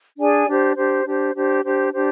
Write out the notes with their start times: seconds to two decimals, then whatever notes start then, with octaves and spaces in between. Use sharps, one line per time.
0.17 D4 G#4 D5 G#5
0.46 D4 G4 C5
0.76 D4 G4 C5
1.04 D4 G4 C5
1.34 D4 G4 C5
1.63 D4 G4 C5
1.93 D4 G4 C5